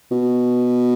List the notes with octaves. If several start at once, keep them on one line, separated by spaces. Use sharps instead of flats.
B2